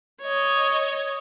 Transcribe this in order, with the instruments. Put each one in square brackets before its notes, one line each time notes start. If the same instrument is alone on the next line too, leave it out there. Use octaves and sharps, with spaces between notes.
[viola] C#5 D#5